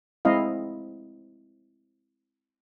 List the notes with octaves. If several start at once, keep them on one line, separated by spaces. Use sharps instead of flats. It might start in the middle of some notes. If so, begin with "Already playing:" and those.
G#3 C4 E4 D#5 F5